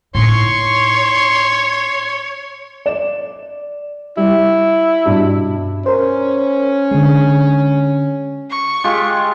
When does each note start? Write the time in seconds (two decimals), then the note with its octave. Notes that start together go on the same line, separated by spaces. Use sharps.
0.15 A2 D#4 C#5 C6 C#6
2.86 D5 E7
4.17 G3 E4
5.06 G2 B2
5.86 C#4 A#4 C5
6.91 D3 G#3
8.50 C#6
8.84 G#3 F4 G4